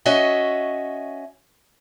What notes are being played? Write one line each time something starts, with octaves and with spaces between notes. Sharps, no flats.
C#4 F#4 D#5 E5